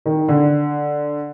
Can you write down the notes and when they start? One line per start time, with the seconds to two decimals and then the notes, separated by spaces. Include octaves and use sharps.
0.06 D#3
0.28 D3